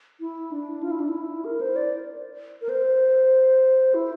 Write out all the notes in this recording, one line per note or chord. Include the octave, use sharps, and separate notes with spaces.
E4
D4
F4
E4
D4
E4
A#4
C5
D5
A#4
C5
E4